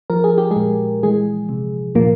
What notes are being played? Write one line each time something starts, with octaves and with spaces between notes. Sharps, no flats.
F3 A#4
G#4
G4
G#3 G#4
A#2
E3 G#3 G#4
C3
A#2 F3 A#3